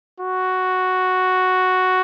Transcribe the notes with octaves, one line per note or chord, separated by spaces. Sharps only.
F#4